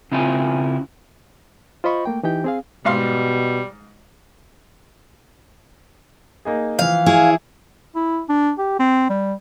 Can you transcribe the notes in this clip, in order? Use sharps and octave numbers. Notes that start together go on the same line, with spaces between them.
C#3 C4 E4 F4 G#5
F4 C5 D#5 B5 C#6
A3 A#3 G5
E3 D#4 G4 G5 G6
C4 G#4 F5
G#2 B2 G3 F5 C6
A#3 D#4 G#4
E3 F3 F5
E4 G#4 C#5
E4
D4
G4
C4
G3